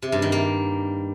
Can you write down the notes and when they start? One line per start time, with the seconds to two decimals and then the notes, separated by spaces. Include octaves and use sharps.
0.02 C3
0.12 G2
0.22 D#3
0.32 A#3